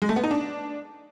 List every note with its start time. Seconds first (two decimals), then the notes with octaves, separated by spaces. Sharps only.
0.02 G#3
0.09 A3
0.16 B3
0.23 D#4
0.31 D4